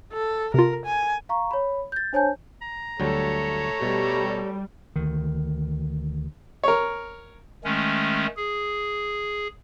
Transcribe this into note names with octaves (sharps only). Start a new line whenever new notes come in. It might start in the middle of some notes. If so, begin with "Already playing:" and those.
A4
C3 F4 A#4
G#5
F5 A#5 C#6
C#5 B5
G6 A6
D4 C5 C#5 G#5 A5 G6
A#5
D2 F#3 G3 A3 A4 C#5
B2 G3
D2 D#3
A#4 C#5
D#3 G#3 A3 C#4
G#4